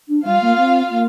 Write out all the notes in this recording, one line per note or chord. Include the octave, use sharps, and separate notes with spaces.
D4
G3 F4 F5
A#3
C4
A#3